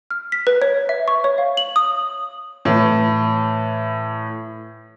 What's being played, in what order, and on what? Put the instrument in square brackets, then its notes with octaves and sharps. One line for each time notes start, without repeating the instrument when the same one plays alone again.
[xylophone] F6
B6
B4
C#5
E5
C#6
C#5
F5
F#7
D#6
[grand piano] A2 E3